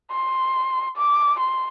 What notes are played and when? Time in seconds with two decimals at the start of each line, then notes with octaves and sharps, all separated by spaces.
0.11 C6
0.97 D6
1.39 C6